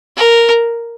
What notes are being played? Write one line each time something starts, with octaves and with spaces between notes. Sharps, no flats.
A#4